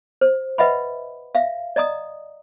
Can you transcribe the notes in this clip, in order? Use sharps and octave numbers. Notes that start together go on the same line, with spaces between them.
C5
B4 D#5 E5 F#5 B5
E5 F5
D5 D#5 A#5 D#6